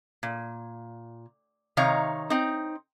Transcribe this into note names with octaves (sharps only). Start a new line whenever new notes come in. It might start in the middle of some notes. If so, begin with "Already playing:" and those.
A#2
C3 D#3 D#4 C#5 F5 A#5
C4 D#4